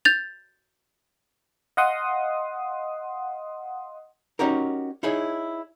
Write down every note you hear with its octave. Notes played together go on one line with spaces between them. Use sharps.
G6 A6 F7
D#5 F5 F#5 C6 D#6
C#4 D#4 F#4 G4 A#4
D#4 E4 G#4 C#5